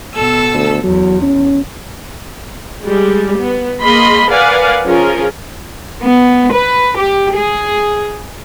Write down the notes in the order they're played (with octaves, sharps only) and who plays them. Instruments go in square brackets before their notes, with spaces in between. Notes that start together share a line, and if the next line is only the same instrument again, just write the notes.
[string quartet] B2 A4 E6
[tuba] D2
[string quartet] E2 [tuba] F#3
[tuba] C#4
[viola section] G3 G#3
B3
A#3 G#4 D#5 B5 C6
A#4 B4 D5 F5 F#5 G#5
F3 C#4 F4 G#4 A#4
[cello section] B3
B4
G4
G#4